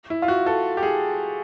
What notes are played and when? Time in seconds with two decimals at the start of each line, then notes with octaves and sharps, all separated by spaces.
0.10 E4
0.22 F4
0.28 F#4
0.46 A4
0.77 G4
0.83 G#4